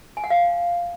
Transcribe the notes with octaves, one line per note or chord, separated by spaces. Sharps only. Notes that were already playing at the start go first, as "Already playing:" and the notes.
G#5
F#5
F5